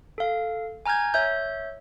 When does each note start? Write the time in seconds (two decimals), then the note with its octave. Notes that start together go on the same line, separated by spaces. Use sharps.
0.18 A4 F5
0.86 G#5 A#5 F6 G6 G#6
1.14 C#5 E5 G6